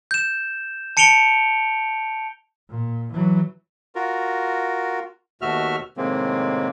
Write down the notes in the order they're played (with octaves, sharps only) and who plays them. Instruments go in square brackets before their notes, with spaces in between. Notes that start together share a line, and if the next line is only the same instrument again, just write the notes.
[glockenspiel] G6 E7
A5 C#7 D7 F7 G7
[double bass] A#2
E3 F#3
[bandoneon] F4 F#4 A#4
D#2 B2 A3 F#4 E5 F6
A2 C3 D#3 G#3 A#3 C4